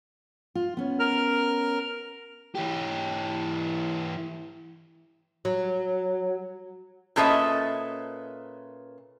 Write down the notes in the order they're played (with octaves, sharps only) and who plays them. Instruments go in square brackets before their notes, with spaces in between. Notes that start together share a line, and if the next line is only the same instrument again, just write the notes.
[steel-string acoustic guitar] F4
B3 C#4
[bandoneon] A#4 F6
[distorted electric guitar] E3 G4
[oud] F#3
[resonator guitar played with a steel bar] A#2 C#4 A4 B4 D#5 E5